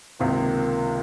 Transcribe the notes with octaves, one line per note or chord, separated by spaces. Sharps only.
C#2 C3 D#3 A#3